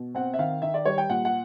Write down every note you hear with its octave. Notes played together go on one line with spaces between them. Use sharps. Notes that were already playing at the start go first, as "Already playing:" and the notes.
Already playing: B2
C4 F#5
E5
D#3 F5
D#3 E5
D5
G3 C#5
G5
A#2 F#5
F#5